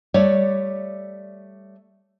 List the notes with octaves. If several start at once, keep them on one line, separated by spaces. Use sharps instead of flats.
G3 A3 C#5 D5